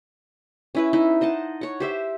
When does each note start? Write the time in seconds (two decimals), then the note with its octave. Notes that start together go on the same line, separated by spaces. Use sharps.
0.75 C#4 E4 B4
0.93 D#4 E4
1.21 C5 D#5 F#5 A5
1.61 C#5 F#5
1.80 G4 C5 E5